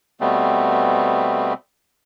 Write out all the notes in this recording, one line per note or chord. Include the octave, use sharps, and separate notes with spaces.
B2 G3 A3 B3 C4